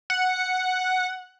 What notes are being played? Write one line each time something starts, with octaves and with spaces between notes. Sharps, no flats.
F#5